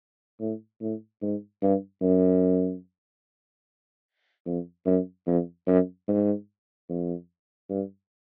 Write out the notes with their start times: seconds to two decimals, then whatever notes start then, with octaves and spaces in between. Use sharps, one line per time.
0.40 A2
0.81 A2
1.22 G#2
1.62 G2
2.02 F#2
4.46 F2
4.86 F#2
5.27 F2
5.67 F#2
6.08 G#2
6.89 F2
7.69 G2